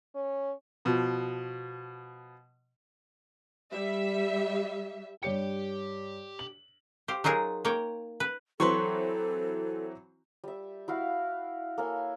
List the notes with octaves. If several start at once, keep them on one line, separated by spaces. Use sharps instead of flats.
C#4
B2 F3
G3 E5
G2 G4 C#5 G5 C#7
F#7
G4 C5 F5
F#3 D#4 F4 G#4 A#4
A#3 C#5 G5
B4
E3 F#3 C4 A4 B4 C6 C#6
G3 E5
E4 F#4 F5
A#3 A4 C#5 G#5